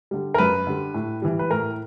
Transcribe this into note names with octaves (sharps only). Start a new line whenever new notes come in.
D3 G3
A#4
F#2 B4
D3 G3
A2
E3 G3
B4
A2 A#4